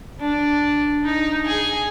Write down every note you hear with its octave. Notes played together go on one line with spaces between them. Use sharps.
D4
D#4
G#4